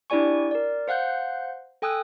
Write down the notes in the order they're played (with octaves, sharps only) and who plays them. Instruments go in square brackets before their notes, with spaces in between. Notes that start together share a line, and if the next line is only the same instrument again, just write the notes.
[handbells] D4 E4 G4 D5 G#5 C#6
A#4 D5
C5 F5 F#5 F#6 G6
A4 G5 G#5 D#6 E6 F#6